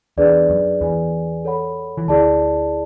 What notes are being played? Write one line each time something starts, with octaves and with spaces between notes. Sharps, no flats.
E2 D4 G#4 B4 D5
F#2
E2 E3 G#4 B4 D5 G#5
A4 C#5 F#5 B5
E3
D2 D3 E4 G#4 D5 A5